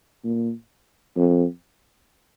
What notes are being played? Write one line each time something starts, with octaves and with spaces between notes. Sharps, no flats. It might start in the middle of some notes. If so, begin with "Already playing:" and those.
A#2
F2